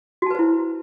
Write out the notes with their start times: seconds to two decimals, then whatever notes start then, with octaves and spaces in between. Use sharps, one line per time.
0.22 F#4
0.26 A5
0.31 B4
0.35 C5
0.39 E4